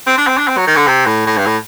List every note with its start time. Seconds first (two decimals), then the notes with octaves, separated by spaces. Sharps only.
0.07 C4
0.18 D4
0.27 C4
0.38 D4
0.48 C4
0.57 F#3
0.67 D#3
0.77 D3
0.87 C3
1.06 A2
1.27 A2
1.37 G2
1.46 A2